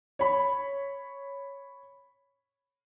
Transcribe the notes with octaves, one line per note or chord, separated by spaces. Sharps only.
C#5 B5